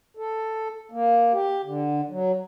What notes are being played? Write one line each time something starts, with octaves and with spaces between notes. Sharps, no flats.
A4
A#3
G4
D3
F#3